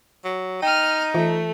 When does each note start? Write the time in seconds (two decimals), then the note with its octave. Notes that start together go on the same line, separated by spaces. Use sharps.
0.24 F#3
0.62 D#4 G5 F6 D#7
1.14 E3 A3 F4 E5